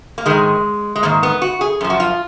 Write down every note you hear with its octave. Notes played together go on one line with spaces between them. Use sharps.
A#3
G#2 D#3 G#3
G#3
G#2 D#3 A#3
B3
F#4
G#4
F#2 F3
F#4
F4